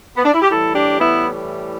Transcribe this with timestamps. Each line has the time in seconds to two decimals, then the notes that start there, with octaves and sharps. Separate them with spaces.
0.17 B3
0.25 D4
0.33 E4
0.42 G4
0.50 A2 E3 G3 E4 A4
0.75 D4 G4
1.00 B3 E4